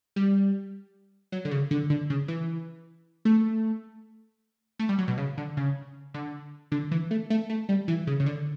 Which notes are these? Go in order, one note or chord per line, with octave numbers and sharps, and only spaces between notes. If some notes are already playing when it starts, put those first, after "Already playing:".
G3
F#3
D3
C#3
D3
D3
C#3
E3
A3
A3
G3
F#3
B2
C#3
D3
C#3
D3
D3
E3
A3
A3
A3
G3
E3
C#3
C#3
D3